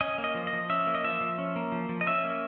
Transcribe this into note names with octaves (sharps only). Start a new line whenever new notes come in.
C#4 D#5
A#3
D#5
F3
D#5
F3
C#4 E5
A#3
D#5
F3 E5
F3
C#4
A#3
F3
F3
D#5
C#4 E5
A#3